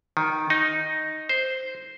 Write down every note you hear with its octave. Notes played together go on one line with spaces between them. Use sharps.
D#3
D#4
C5